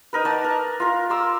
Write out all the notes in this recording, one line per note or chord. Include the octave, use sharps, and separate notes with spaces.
D#4 A#4 B4
D5 F#5 A5
A#4
F4 A#4
A#5 C6 D6 E6